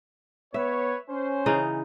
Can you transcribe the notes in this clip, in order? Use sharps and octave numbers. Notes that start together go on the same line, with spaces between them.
B3 B4 C#5 E5
C#4 C5
C#3 E3 D#4